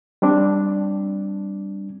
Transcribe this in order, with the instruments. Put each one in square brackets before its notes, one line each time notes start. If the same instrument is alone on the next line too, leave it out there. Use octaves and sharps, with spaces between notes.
[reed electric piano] G3 C4 D4